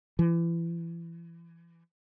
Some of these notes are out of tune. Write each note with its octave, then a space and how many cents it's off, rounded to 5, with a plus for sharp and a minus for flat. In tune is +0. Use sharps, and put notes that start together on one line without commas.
E3 +35